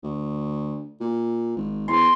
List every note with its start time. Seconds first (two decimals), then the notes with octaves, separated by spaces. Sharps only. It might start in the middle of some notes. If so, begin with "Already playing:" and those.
0.03 D2
1.00 A#2
1.56 G#1
1.88 E2 C6